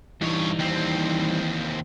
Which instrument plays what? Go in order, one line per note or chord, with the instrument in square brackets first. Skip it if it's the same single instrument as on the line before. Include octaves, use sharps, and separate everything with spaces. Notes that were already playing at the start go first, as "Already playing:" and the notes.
[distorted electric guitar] G2 C#5 [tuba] E3 [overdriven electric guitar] G3 D#4
[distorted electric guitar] D#2 C4